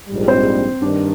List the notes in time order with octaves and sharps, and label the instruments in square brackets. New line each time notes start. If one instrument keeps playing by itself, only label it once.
[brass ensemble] A#1 G#2 G3
[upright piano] C4 C5
[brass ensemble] G2 D#3 [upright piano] D4 D5